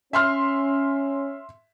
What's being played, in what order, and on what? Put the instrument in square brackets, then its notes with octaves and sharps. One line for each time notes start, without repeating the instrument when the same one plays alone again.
[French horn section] C#4 [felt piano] E5 C6 F6